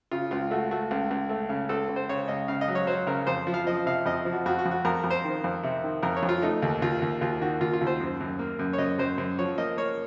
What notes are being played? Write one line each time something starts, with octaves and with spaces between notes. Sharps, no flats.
C#3 F4
C#2 F4
A3 F#4
A3 F#4
C#2
C#2
A3
C#3
C#2 A4
C#2
C5
C#3 C#5
C#2 D#5
C#3 F5
D#5
F#3
C#5
F#3 C5
C#3 A#4
F2 C5
F3
F5
F3 D#5
C3 F5
F2 D#5
F3
F#4
F2 F#4
F#4
F2
F#4
F2 A#4
F2
C5
D#3
F2
C3
D#3
F2 A#4
C#5
F2
F4
A3 D#4
D#2
D#2 F4
D#2
D#2 F4
D#3 F#4
D#2 F4
F4
D#2
C5
F#2
F#2
A#3
F#2
C#5
F#2 D#5
F#2 C5
F#2
F3 C#5
A#3 D#5
A#3 C#5